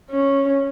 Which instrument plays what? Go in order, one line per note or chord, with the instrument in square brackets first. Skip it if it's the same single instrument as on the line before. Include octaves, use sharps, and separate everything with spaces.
[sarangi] C#4